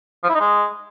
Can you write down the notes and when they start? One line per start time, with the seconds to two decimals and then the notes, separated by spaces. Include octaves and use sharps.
0.24 F3
0.29 E4
0.35 D#4
0.40 G#3